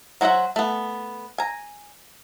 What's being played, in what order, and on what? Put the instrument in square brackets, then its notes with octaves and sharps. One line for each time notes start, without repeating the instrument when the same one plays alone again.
[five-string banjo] F#3 F#4 C5 E5 F#5
A3 B3
G#5 A#5